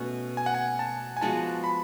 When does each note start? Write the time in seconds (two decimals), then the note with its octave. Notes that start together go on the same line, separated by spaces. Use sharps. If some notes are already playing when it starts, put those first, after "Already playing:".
Already playing: B2 A3 C#4
0.37 G#5
0.46 F#5
0.54 G#5
0.79 A5
1.17 G#5
1.21 F3 G#3 B3 F#4 A5
1.64 B5